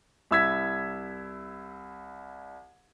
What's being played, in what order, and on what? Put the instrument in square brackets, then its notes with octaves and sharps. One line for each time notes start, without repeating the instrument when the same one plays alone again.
[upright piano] C2 E4 E6 G#6 B6